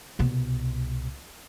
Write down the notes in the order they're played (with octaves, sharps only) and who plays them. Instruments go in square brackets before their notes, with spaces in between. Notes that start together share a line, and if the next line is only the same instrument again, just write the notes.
[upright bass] C2 B2